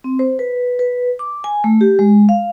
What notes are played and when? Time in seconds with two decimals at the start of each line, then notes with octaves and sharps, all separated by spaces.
0.04 C4
0.19 C5
0.39 B4
0.79 B4
1.19 D6
1.44 G#5
1.64 A3
1.81 G4
1.99 G#3
2.29 F5